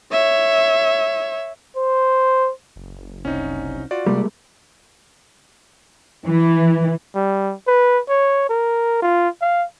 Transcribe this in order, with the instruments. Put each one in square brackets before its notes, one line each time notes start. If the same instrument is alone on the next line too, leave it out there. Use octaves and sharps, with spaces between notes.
[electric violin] C#5 E5
[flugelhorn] C5
[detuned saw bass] F#1
[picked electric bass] C2 [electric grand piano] C#4 D#4
[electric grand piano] F4 F#4 D5
[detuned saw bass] C3 [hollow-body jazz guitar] G3 [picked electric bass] G#3 A#3
[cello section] E3
[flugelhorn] G3
B4
C#5
A#4
F4
F5